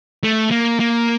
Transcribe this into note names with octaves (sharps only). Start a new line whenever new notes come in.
A3
A#3
A#3